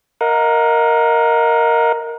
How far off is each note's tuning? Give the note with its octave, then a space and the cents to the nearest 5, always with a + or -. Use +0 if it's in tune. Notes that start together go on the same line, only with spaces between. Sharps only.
A#4 +0 D#5 +20 F#5 -45